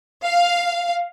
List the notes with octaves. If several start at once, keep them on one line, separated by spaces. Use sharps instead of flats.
F5